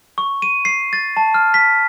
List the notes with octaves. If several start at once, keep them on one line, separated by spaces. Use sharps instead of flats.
C#6
D#7
C7
A6
A5
F6
B6